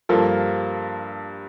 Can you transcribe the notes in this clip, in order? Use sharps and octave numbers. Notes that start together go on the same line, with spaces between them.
G2 F3 A#3 F4 A4